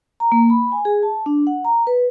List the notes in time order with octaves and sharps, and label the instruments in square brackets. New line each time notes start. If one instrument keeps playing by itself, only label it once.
[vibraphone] A#5
A#3
B5
G#5
G#4
A5
D4
F#5
A#5
B4